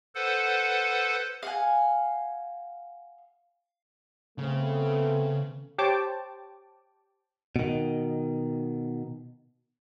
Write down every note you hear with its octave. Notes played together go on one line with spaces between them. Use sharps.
A4 B4 C5 F#5
F5 F#5 G#5
C#3 A3 B3 C4
G4 C5 C#5 G5 A5 D6
B2 D#3